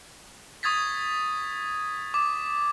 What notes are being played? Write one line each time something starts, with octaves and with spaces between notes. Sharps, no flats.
C#6 D#6 G#6 A6 B6
D6